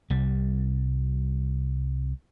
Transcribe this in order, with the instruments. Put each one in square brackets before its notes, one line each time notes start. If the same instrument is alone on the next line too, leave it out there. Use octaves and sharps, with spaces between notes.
[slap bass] C2 G3